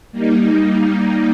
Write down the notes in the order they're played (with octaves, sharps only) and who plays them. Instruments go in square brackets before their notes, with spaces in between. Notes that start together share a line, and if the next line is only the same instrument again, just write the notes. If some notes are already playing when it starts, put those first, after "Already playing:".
[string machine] G3 A#3 D#4